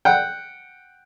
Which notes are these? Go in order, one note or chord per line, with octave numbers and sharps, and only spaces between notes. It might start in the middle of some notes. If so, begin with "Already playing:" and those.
F#5 G5